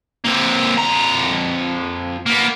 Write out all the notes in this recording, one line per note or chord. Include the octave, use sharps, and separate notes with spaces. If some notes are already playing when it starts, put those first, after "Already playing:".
A#3 C4
F2 A#5
A#3 B3